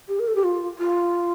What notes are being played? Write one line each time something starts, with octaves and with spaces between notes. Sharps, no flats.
G4
A#4
A4
G4
F4
F4